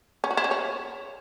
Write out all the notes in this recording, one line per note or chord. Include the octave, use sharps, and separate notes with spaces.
C#4
F#4
E4
C#4
C#5